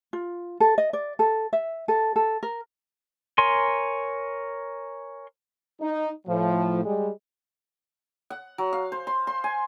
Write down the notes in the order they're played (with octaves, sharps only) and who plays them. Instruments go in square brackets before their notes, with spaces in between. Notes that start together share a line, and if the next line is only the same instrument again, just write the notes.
[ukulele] F4
A4
D#5
D5
A4
E5
A4
A4
A#4
[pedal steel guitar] A#4 C#5 G#5 C6
[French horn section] D#4
A2 F3
G3 G#3
[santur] F#5
F#3
F5
C5
C6
C6
G#5